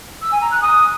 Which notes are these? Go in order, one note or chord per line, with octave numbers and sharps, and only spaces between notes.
E6
G#5
A#5
F#6
D#6